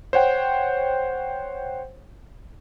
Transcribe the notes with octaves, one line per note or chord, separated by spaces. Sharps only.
C5 C#5 F#5 G5